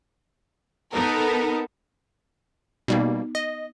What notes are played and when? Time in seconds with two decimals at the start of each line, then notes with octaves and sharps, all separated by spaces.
0.92 B3 D#4 A4 A#4
2.88 B2 G3 A#3 B3 D#4
3.35 D#5